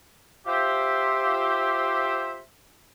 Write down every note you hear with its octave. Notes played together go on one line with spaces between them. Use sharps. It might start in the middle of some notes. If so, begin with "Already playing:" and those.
F4 G4 C5 E5